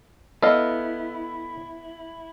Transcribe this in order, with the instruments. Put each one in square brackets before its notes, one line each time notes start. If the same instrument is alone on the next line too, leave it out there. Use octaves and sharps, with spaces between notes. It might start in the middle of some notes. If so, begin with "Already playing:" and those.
[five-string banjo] B3 D#5 [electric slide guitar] E4 [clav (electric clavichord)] A4 F5